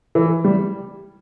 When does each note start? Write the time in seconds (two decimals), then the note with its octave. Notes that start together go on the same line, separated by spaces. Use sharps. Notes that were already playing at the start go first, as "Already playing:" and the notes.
0.15 E3
0.44 G3